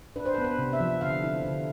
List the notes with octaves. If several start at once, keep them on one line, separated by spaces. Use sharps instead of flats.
D4 B4
C5
B4
B3
B4
C3
E5
F3
D3 F5
E4
D3